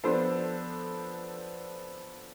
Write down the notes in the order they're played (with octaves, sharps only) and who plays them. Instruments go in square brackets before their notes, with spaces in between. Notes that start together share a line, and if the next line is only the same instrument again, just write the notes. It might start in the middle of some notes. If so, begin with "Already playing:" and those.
[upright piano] F3 B3 D4 A4 C5